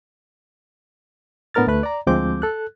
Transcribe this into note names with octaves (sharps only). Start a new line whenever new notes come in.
A2 B3 D4 A#4 F6 A6
D2 A3 B4 F#6
D5 A#5
D2 F3 G#3 C4 D6 G6
A4 F#6